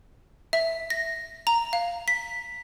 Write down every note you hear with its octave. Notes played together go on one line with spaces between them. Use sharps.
E5
A#6
A#5
F5
B6